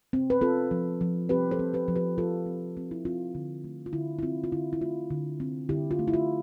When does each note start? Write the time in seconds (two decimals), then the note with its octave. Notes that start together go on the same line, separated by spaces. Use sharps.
0.13 C4
0.30 B4
0.41 C4 F4 A4
0.71 F3
1.01 F3
1.29 C4 G4 B4
1.51 A4 C5
1.59 C4
1.73 G4 B4
1.88 F3
1.96 G4 B4
2.18 F3 F4 A4
2.46 C4
2.77 C4
2.91 E4
3.05 C4 F4
3.35 D3
3.64 A3
3.86 F4
3.93 D3 E4
4.19 E4
4.22 C4 F4
4.44 F4
4.52 D3 E4
4.73 E4
4.81 A3 F4
5.10 D3
5.40 C4
5.69 D3 E4 G4
5.91 F4
5.99 A3
6.08 E4
6.14 F4